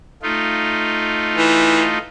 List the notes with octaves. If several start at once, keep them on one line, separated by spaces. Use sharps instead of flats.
A3 D#4 F4
E3